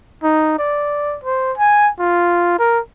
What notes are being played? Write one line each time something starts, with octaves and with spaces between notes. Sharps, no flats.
D#4
D5
C5
G#5
F4
A#4